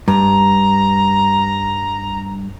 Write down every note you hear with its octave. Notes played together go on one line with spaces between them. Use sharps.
G2 A#5